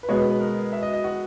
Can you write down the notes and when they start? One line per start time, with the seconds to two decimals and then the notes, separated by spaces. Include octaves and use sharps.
0.03 B4
0.08 B2 G#3 B3 C#5
0.19 B4
0.30 B4
0.40 A#4
0.72 E5
0.82 D#5
0.93 D#5
1.04 F#4